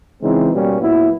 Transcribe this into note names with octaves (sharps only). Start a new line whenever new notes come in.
C#3 E3 G#3 C4 D#4
B2 G3 A#3 C#4
A#2 F#3 B3 E4